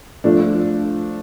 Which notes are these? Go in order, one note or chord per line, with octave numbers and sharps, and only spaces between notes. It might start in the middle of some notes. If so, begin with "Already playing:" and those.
F3 A3 D4